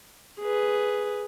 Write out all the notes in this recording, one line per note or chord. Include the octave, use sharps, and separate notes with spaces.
G#4 B4